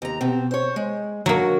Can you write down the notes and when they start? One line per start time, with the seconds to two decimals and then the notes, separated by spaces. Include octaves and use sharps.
0.02 D#2 A#5
0.21 B2 C4
0.51 C5 C#5
0.76 G#3
1.26 D3 F#3 A#3